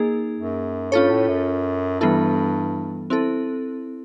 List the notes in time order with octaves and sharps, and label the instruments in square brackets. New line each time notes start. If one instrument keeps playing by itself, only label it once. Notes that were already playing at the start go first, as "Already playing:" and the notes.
Already playing: [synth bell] A#3 D#4 G#4
[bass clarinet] F#2
[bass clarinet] G2 [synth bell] C#4 F4 A4 C#5
[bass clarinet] A2
F#2
[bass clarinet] G2 [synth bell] E3 G3 B3 E4 A4
[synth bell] C4 E4 A4